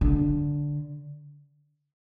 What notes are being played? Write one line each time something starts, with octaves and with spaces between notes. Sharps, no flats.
D3